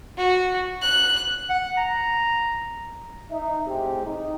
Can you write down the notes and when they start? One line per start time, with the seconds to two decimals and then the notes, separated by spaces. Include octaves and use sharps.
0.18 F#4
0.82 F#6
1.49 F#5
1.77 A#5
3.30 D#4 E5
3.67 A2 G#3 C4 G4
4.05 D#4